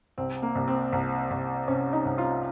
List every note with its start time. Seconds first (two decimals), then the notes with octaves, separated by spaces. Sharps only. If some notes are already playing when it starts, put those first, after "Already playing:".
0.18 C2 C4
0.42 A#3
0.55 C2
0.68 C4
0.92 C2
1.30 C2
1.68 C3 C#4
1.93 D#4
2.05 C2
2.18 F4